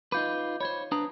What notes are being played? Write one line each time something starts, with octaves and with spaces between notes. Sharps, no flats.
D#4 F4 B4 D6 G6
C5 C#5 B5 G#6
D4 B4 A#5 D#6